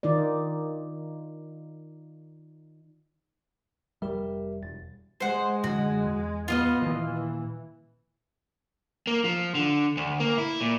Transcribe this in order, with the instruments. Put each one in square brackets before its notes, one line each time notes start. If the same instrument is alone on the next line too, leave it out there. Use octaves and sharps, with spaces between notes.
[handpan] D#3 D#4 F4 D5
[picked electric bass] F1 C2 G3 [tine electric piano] G4 A#4 E5
[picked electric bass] E1 [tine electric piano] A6
[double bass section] G#3 [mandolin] C5 F#5
[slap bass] F#2 D3 C#4 [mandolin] F#4
[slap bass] E2
[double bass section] B3 [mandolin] F4 D#5 F5
[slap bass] A#2 D#3 A#3 [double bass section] E3
[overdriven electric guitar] A#3
F3
D3
D2
A#3
E4
A#2